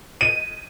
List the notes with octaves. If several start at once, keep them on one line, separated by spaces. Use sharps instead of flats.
D#7